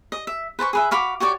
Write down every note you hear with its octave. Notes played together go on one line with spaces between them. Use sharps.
D#5
E5
B4 C5 A5 C#6
G#4 B4 E5
F#4 F5 B5 D6
F#4 G4 C#5 D5